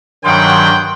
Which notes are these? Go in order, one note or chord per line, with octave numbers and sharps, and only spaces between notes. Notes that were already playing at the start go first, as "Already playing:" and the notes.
G2 D#3 F#3 G#4 F#5 G5 C6